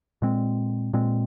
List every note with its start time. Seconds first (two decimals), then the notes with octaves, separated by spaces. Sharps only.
0.22 A#2 G#3 C4
0.94 A#2 G#3 C4